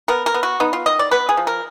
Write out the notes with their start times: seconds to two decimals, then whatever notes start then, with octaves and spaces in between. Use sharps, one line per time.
0.08 B3 A#4
0.26 A#4
0.34 B3
0.43 F#4
0.60 B3 D#4
0.73 F4
0.86 D#3 D#5
0.99 D5
1.11 B3 B4
1.29 G#4
1.37 F3
1.47 A#4